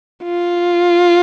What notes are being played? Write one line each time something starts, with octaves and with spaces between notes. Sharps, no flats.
F4